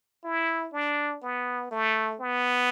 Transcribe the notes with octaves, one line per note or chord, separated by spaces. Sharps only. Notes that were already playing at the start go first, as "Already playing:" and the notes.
E4
D4
B3
A3
B3